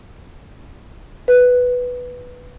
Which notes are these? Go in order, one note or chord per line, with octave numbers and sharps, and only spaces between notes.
B4